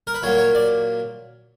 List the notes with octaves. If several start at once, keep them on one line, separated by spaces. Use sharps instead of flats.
A#4
B4
A#2 F#3 A#3 C#5
C#5
D5